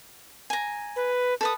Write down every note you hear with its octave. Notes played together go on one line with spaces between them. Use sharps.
G#5 A#5
B4
A4 B4 D#6